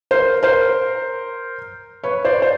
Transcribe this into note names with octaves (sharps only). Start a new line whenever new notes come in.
A#4 C5
A#4 C5
B4 C#5
C5 D5
C5